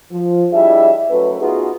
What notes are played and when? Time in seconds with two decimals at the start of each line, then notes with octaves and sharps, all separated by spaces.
0.12 F3
0.53 G3 D4 E4 G#4 D#5 E5
1.10 F#3 A3 C#4 B4
1.40 B3 D#4 F4 F#4 G#4